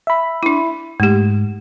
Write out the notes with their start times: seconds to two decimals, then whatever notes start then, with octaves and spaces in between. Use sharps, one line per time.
0.07 E5 B5
0.43 D4 E4
1.00 G#2 A3 G4